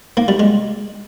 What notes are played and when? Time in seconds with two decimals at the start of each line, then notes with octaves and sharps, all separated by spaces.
0.17 A#3
0.28 G3
0.39 G#3